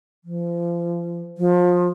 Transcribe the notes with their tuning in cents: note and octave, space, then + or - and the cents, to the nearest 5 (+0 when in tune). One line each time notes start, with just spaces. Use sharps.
F3 -30
F3 +25